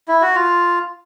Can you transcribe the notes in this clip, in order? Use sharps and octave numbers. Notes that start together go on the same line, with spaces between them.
E4
F#4
F4